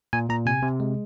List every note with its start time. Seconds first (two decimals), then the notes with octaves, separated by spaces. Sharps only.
0.13 A#2 G#5
0.30 A#2 A#5
0.46 C3 G#5
0.63 C3
0.80 G#3